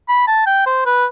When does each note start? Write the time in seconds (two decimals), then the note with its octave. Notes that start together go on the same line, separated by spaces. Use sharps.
0.08 B5
0.27 A5
0.46 G5
0.66 C5
0.86 B4